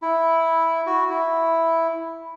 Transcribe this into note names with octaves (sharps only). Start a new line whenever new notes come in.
E4
F#4
E4